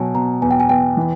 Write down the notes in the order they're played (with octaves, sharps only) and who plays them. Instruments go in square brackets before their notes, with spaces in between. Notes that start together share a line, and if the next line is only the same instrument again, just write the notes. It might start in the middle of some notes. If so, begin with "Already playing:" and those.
Already playing: [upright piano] B2 F#3 [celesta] G#5 A5
[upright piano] B2 [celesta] A#5
[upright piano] E2 [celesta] G#5
[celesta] G5
G#5
[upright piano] E2 [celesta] G5
[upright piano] E3